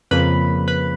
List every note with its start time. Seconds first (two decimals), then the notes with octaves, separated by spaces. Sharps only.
0.11 F2 C#3 F3 A#3 B4 B5
0.68 B4 B5